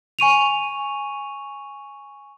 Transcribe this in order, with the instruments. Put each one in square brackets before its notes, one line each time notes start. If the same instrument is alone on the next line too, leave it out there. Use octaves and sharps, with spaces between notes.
[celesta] G#5 C#6 D#7 F7